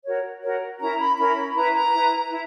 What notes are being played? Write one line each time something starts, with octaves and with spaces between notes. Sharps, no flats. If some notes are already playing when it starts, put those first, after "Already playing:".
F#4 A#4 C#5
F#4 A#4 C#5
C#4 E4 A#4 A#5
B5
C#4 E4 A#4 B5
E4 B4 A#5
A#5
E4 B4
E4